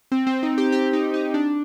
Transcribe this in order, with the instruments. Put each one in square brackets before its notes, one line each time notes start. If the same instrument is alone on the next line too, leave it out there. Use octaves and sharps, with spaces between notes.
[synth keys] C4
C4
D#4
G4
G4
D#4
D#4
D4